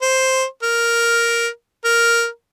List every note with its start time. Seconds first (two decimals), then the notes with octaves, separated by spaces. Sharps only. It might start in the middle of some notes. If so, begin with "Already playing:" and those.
0.02 C5
0.63 A#4
1.85 A#4